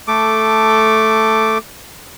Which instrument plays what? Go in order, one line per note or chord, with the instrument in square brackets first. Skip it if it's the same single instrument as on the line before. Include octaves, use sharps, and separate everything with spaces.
[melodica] A3 A4 D6